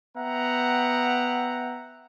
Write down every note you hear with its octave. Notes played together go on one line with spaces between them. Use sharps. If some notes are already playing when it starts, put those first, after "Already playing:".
B3 E5 F#5 G5 A#5